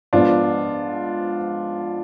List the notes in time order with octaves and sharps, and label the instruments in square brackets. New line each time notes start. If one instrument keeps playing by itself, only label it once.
[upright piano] G#2 F3 B3 [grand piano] D4 F4